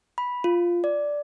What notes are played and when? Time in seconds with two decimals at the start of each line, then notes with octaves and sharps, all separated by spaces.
0.18 B5
0.44 F4
0.84 D5